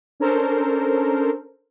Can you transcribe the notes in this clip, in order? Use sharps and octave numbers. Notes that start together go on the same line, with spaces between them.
C#4 D4 A4 A#4 C5